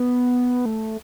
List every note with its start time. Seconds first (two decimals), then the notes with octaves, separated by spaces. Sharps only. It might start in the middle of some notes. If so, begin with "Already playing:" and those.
Already playing: B3
0.66 A3